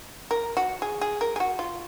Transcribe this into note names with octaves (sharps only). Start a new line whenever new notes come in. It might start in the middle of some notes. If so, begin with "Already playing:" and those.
A#4
F#4
G#4
G#4
A#4
G#4
F#4
F4